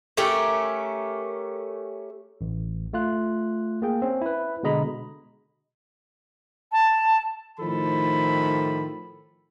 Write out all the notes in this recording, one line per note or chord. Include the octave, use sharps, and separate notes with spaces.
A3 C#4 G4 A#4
A1
A3 F4 F#6
A#3 G#4 G5
C4 C#4
E4 B4
B2 D3 G#3 D#5 A#5 B5
A5
A2 D#3 F3 A4 B5